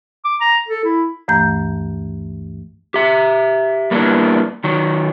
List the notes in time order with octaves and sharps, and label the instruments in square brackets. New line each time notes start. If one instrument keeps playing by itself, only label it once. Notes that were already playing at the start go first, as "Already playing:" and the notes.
[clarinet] D6
A#5
A4
E4
[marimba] D2 G2 E3 A3 A#5 G6
[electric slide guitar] G4 E5
G3 A#3 B3 C#4 D4 E4
D#3 F#3